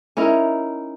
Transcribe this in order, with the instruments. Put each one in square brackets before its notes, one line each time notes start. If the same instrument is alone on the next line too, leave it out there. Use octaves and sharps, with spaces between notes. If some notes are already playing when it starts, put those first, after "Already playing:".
[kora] C#4 D#4 E4 A#4